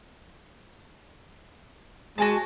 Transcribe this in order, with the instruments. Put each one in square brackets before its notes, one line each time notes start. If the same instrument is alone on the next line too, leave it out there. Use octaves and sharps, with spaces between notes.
[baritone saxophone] G#3 [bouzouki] F#4 G#5 A5